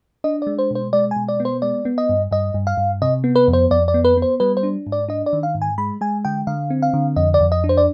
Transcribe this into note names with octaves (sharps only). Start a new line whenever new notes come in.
D4 D#5
G#3 D5
C5
B2 C5
G#3 D5
G#5
B2
D5
B3
C5
G#3 D5
B3
D#5
G2
G2 D#5
G2
F5
G2
C3 D#5
B3
B4
F2
C5
F2 D5
D5
B3
B4
B3
C5
G3 B4
C5
D4
G#2
D5
D4 D#5
D5
D#3
F5
G#2
G#5
G#3 B5
G#3 G#5
D3 G5
D3 F5
C4
F5
D3
F2 D#5
D5
F2
D#5
D4
C5
D5